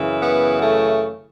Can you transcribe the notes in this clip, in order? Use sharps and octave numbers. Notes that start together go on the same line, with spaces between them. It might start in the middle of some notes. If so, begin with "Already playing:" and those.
Already playing: F#2 C#3 E3
B3
A3